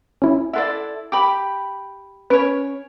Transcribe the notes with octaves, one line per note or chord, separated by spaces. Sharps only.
C#4 E4
E4 A4 D5 E5 F#5 C6
G4 G5 B5 D6
C#4 B4 C#5 D7